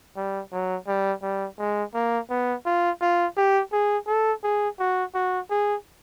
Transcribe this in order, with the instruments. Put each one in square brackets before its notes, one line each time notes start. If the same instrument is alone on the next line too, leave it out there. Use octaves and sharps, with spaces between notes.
[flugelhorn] G3
F#3
G3
G3
G#3
A#3
B3
F4
F4
G4
G#4
A4
G#4
F#4
F#4
G#4